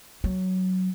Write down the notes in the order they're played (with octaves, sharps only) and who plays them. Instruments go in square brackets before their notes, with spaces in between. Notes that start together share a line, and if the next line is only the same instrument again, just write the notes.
[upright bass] F#3